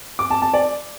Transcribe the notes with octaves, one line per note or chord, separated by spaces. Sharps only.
D6
A5
A5
D5